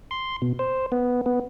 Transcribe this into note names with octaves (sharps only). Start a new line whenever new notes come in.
C6
B2
C5
B3
B3